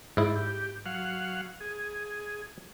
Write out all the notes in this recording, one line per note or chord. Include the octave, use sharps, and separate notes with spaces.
G#2 E4 D5
G4
F#3 F5 F#5
G#4